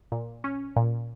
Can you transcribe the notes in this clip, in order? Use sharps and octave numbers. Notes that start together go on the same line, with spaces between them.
A#2
C#4
A#2